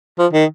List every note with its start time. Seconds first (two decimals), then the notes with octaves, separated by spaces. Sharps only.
0.19 F3
0.33 D#3